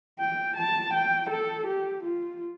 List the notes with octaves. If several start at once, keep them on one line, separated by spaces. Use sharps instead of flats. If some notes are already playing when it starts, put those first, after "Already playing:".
G5
A5
G5
A4
G4
F4